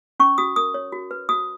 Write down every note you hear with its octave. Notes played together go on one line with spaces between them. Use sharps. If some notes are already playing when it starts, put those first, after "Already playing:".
C#4 C#6
F#4 D#6
A#4 D#6
C#5
F#4
B4
F#4 D#6